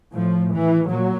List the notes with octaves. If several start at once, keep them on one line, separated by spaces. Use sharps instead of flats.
A2 F3
E3
A#2 F#3